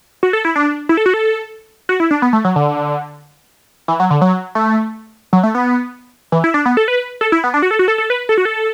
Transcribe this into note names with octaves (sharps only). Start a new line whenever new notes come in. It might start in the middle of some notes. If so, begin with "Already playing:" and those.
F#4
A4
E4
D4
E4
A4
F#4
A4
F#4
E4
D4
B3
A3
F#3
D3
E3
F#3
D3
F#3
A3
F#3
A3
B3
E3
E4
D4
B3
A4
B4
A4
E4
B3
D4
F#4
A4
F#4
A4
A4
B4
A4
F#4
A4